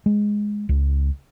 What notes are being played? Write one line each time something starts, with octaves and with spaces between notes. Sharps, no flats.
G#3
C#2